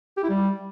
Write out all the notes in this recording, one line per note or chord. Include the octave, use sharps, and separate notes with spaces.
G4
E4
G3